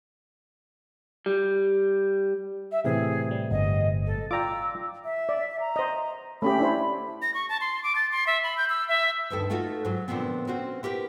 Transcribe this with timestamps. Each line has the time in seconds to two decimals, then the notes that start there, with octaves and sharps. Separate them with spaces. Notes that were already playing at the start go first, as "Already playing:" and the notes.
1.26 G3
2.72 E5
2.84 A2 C3 E3 G#4
3.31 G3
3.51 G1 D#5
4.06 A4
4.31 F4 D5 G5 A#5 D6 E6
5.05 E5
5.29 D5
5.60 A#5
5.76 C5 D#5
6.42 A3 C#4 G4 B5
6.59 D4 E4 C5
7.22 A#6
7.34 C#6
7.49 A5
7.61 C6
7.83 D6
7.95 A6
8.12 C6
8.27 E5
8.43 B5
8.57 G6
8.69 E6
8.88 E5
9.30 D2 G2 D#3 A4
9.50 A3 D#4 F4 F#4 A4
9.85 G#2 F#3
10.08 A#2 D3 F3 A3 B3 C4
10.47 C4 C#4 F#4 C5
10.83 E4 G4 A#4 B4